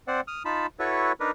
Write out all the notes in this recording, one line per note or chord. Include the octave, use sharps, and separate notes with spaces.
C4 C5 D5 F#5
D#6 F6
D#4 F4 A5 B5
E4 F#4 A4 B4 C#5
D4 D#4 A#4 B4